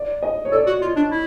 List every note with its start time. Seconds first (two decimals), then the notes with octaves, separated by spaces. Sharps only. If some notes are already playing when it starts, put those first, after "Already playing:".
Already playing: D5
0.23 D#5
0.45 C#5
0.52 A4 D5
0.67 F#4
0.82 F4
0.96 D4
1.11 E4